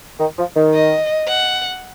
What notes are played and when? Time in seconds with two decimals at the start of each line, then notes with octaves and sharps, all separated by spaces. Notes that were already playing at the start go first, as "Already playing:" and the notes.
0.20 D#3
0.38 F3
0.56 D#3
0.74 D#5
1.27 F#5